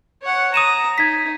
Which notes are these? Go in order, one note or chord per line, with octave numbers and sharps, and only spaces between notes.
C#5 F#5
A#5 D#6 D#7 E7
D#4 G#6 B6